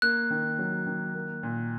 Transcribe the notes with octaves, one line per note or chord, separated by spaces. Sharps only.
A#3 F#6
D#3
F#3
D#3
A#3
A#2